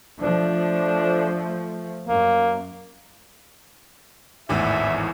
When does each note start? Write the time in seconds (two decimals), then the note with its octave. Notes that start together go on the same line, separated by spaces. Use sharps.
0.20 F3 A3 D4
2.08 F#2 A#3
4.49 G#1 E2 A2 E5